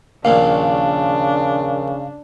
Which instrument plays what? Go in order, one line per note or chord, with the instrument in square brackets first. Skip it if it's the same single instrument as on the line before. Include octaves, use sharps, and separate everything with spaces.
[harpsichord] A#1 D#2 A#2 [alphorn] C#3 [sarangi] D4 [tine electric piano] F5